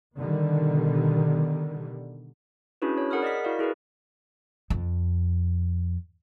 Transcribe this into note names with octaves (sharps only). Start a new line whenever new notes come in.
B2 D3 D#3 G3
C#4 D4 E4 F#4 G#4 B4
C#5
G#4 A#4 F#5 B5 D#6 F6
D5 D#5 F6 B6
E4 F#4 A#4 D5 F5
E4 G#4 A#4 B4
F2